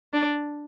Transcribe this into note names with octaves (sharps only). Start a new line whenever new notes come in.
D4